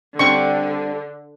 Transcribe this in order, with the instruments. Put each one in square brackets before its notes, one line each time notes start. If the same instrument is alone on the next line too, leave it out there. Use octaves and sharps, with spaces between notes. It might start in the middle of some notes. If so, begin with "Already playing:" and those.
[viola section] D3 [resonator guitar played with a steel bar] G3 C4 D4 [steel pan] C#6